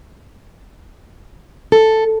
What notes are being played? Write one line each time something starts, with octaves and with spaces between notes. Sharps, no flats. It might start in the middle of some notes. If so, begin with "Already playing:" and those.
A4